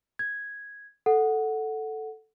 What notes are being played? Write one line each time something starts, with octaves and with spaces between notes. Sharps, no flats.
G#6
A4 F#5